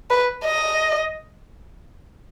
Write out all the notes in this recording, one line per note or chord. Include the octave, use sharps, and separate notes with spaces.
B4
D#5